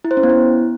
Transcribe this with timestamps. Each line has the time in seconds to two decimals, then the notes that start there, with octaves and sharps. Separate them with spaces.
0.04 E4
0.11 C5
0.17 C#4
0.23 B3
0.30 E4